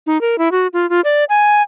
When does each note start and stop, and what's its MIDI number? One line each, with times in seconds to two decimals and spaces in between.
0.07 0.20 63
0.21 0.38 70
0.38 0.51 64
0.52 0.67 66
0.73 0.89 65
0.90 1.01 65
1.04 1.24 74
1.29 1.62 80